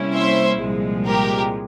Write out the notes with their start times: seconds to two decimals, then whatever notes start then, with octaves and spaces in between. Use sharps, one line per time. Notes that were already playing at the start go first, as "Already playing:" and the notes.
Already playing: C3 G3 A#3 C#4 E4
0.13 C5 E5
0.60 C2 A#2 F3 G#3
1.07 G4 A#4